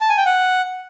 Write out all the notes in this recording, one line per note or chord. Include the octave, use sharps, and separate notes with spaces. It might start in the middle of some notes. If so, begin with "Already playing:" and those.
A5
G#5
G5
F#5